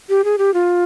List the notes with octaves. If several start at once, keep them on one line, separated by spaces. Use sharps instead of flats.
G4
G#4
G4
F4